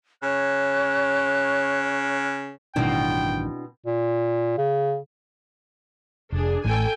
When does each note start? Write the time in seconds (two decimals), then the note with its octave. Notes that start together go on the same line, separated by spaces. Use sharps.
0.23 C#3 C#5 F#6
2.76 A1 G2 B2 D#3 C4 D4 E4 G5
3.86 A#2
4.58 C#3
6.32 F1 D4 G#4
6.65 A1 A2 A4 G5 G#5